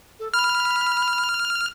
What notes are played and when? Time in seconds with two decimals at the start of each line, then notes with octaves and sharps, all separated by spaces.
0.20 A4
0.34 B5 F6